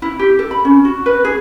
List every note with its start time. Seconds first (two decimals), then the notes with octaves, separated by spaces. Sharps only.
0.02 E4
0.19 G4
0.39 A4
0.51 B5
0.65 C#4
0.85 F#4
1.06 B4
1.25 G#4